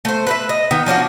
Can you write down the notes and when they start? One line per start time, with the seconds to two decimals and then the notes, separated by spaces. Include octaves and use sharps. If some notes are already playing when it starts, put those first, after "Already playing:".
0.05 A3 C5
0.27 B4 C5 E5
0.49 D#5
0.71 D#3 B3
0.86 F3 C#4 D4 F#4